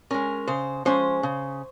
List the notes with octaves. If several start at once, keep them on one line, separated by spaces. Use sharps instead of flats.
G#3 C#4 A#4
C#3 C5
F3 G#3 C#4 C5
C#3